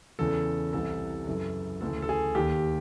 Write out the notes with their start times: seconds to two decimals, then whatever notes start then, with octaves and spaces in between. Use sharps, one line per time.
0.19 E2 C#3 E3 A4
0.73 C2 C3 E3 A4
1.27 F#2 C#3 E3 A4
1.81 D2 C#3 E3 A4
2.02 A4
2.09 G#4
2.35 D#2 D#3 G4